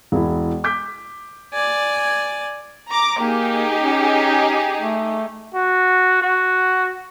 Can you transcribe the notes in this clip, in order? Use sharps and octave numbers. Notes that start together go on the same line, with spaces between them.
E1 E4
D6 G6 B6
D5 G#5
A#5 D6
A#3 D#4 G4 G#4
C#4
A3
F#4
F#4